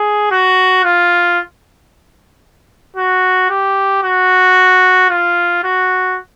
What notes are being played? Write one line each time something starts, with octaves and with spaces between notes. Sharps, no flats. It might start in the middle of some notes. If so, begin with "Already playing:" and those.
Already playing: G#4
F#4
F4
F#4
G4
F#4
F4
F#4